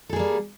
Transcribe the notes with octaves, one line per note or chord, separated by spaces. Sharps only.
G3 A#3 G#4 A4